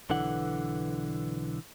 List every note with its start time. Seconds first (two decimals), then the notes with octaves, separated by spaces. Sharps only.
0.10 B1 D3 E3 F#5